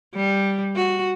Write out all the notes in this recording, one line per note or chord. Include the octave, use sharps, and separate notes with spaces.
G3
F#4